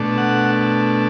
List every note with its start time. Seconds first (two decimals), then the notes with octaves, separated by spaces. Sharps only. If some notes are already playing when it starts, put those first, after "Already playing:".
Already playing: B2 A3 D4
0.18 F#5